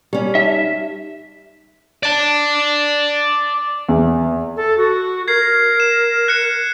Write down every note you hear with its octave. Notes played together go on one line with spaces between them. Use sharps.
G3 C#4 G4
D#4 E5
D5 A5
E2
A4
F#4
A#4 G#6 C7
E7
F#6 C#7 E7